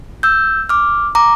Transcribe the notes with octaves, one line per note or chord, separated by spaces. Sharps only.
E6 G6
D6 F6
A#5 D6